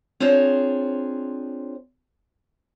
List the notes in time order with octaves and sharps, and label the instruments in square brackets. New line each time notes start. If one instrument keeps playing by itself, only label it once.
[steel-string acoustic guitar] C4 D4 F4 G#4 C5 C#5